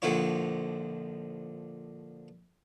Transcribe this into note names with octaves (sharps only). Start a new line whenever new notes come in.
A#1 D3 F3 E4 C#5